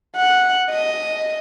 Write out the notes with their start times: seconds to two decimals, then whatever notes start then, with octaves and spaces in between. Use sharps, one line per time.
0.16 F#5
0.70 D#5